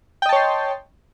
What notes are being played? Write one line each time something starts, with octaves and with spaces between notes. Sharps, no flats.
C#5 D#5 G5 A5 C6